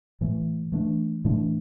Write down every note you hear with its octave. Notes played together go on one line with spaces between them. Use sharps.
A2 E3 A3
E3 A3 D4
A2 E3 A3 D4